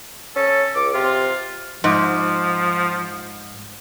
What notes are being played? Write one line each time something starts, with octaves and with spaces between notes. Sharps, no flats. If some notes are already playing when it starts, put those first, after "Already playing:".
C#4 A4
C#2 D6
C3 F4
G#2 F3